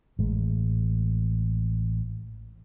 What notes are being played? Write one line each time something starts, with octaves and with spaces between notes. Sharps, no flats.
A1 G#3